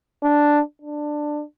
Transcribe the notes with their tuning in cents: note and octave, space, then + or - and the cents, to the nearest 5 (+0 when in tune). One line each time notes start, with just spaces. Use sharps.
D4 +0
D4 +15